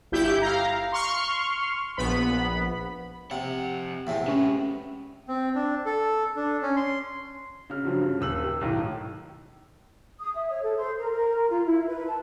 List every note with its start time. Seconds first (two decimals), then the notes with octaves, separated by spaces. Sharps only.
0.12 G1 E4 G4 G6
0.41 F5 A#5
0.92 C6 C#6 F6
1.97 A#1 B3 B5
3.31 F2 C3 F#5
4.07 E2 A2 C3
4.28 G#3 C#4 B4
5.28 C4
5.55 D4
5.86 A4
6.36 D4
6.62 C#4
6.76 C6
7.70 C#3 F6
7.84 G2 F3 F#3
8.02 C#3
8.21 D#1 E6 F#7
8.43 G4
8.61 B1 A2 D#3
10.20 D#6
10.34 E5
10.50 C#5
10.62 A4
10.77 C5
10.99 A#4
11.12 A#4
11.49 F4
11.64 E4
11.88 B4
12.06 A5